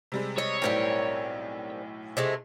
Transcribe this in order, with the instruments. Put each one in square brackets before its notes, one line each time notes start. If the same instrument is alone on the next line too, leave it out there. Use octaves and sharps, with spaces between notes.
[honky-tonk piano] C3 G3 G#3
[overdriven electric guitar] C#5 [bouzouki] D#5
[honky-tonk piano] B1 A2 [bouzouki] G3 C4 A#4
[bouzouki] C3 G#3 A3